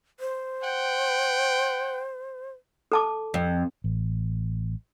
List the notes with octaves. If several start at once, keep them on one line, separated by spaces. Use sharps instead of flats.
C5
F#5 G5
A4 A5 D6
F2
A1